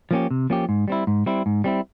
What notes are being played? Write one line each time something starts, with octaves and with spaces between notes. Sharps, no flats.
F3 A#3 C#4 G4
C3
F3 A#3 C#4 G4
G#2
G3 C4 E4
G#2
G3 C4 E4
G#2
G3 C4 E4